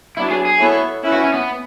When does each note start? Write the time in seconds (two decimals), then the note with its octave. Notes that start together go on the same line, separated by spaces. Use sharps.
0.17 F#3 B3 D4 E4
0.31 G#4
0.45 G#4
0.59 B3 E4 A4 C#5
1.03 C#4 E4 B4
1.12 F#4
1.24 C#4
1.34 B3